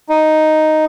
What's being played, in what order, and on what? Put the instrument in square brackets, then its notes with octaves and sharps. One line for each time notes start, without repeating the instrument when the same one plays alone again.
[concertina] D#4